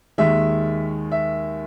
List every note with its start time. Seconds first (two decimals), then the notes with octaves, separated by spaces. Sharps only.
0.18 D#2 D#3 G#3 E5
1.12 E5